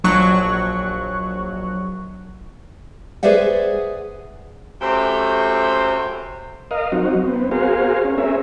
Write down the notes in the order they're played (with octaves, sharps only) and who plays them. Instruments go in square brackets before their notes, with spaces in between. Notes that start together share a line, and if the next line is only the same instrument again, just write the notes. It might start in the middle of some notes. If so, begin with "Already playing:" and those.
[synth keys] A#1 F#3 C#6 F#6
[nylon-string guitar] G#4 B4 C5 D5 E5 F#5
[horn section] F#2 A3 C4 G4 C5
[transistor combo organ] A#4 D#5 F5
F#3 C4 D#4 F#4
B3 C4
F#4 G#4 A#4 C5 F5
C#4
C4 C#4 G#4 A#4 E5